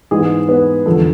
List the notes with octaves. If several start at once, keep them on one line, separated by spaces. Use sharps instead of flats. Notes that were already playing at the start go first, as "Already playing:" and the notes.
G#2 E3 G#3 B3 G#4
B3 B4
E2 D3 F3 A3